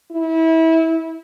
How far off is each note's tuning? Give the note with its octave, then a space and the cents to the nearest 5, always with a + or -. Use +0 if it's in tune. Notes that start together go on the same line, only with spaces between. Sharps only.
E4 -25